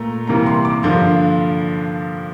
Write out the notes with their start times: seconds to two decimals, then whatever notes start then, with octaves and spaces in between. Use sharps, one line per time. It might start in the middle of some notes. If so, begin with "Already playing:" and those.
Already playing: A#2 A3 A#5
0.27 C3 E3 G3 A#3 A#5
0.46 C6
0.65 D6
0.83 G2 D3 F3 A#3 C6